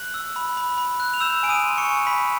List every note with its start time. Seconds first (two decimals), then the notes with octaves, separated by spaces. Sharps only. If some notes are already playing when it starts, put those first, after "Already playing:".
Already playing: F#6 F#7
0.14 E6
0.36 B5
0.57 B5
0.78 B5
1.00 F#6
1.14 F7
1.20 E6 G6 E7
1.43 G#5 D7
1.49 D#6 D#7
1.64 C6
1.78 C#6 C#7
1.85 G#5
2.07 G#5 B5 B6